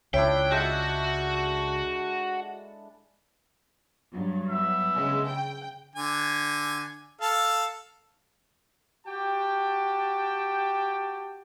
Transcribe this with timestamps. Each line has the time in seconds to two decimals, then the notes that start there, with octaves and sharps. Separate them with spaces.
0.14 C#2 D4 E4 C#5 E5 G5
0.51 G#3 F#4 A4 E5 G6
4.12 G2 F#3
4.50 B3 E5
4.95 C#3 G#3
5.28 G5
5.96 D3 G#5
7.21 A4 F5 A5
9.06 F#4 G4 G5 A5